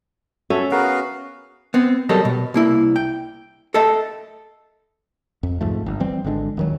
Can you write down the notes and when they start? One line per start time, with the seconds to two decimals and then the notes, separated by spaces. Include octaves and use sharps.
0.50 C#4 F#4 A4 E5
0.71 B3 F#4 G#4 A#4 F5
1.74 B3 C4
2.09 F#3 G3 A4 A#4 D#5
2.25 B2
2.54 C2 A#3 E4
2.96 G5
3.74 A4 D#5 E5 G5 A5
5.43 F2
5.61 C2 G#2 F3 A3
5.86 G1
6.00 E3 G3 C4
6.24 G#1 D3 G#3 D4
6.57 D#1 D#3 F#3